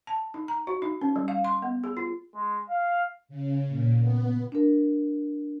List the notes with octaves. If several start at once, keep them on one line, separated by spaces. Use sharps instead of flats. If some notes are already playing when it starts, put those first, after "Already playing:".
A5
D#4
A#5
F#4
D#4
C#4
G3
F5
C6
B3
G#4
F4
G#3
F5
C#3
A#2
B3
D4 A#4